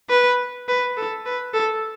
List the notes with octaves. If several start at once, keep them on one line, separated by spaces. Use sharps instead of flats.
B4
B4
A4
B4
A4